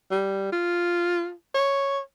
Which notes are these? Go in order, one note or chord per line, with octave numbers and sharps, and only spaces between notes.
G3
F4
C#5